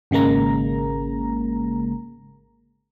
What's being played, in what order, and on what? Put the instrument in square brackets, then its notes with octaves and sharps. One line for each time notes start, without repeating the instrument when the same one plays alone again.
[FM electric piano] G#1 C#3 G#3 A#3 A#5